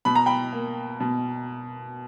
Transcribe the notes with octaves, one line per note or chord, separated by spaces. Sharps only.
B2 B5
A#5
G5 B5
A#3
B2